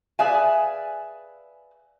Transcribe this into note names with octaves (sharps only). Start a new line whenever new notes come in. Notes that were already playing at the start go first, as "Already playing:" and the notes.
G#4 B4 D5 E5 F5 G#5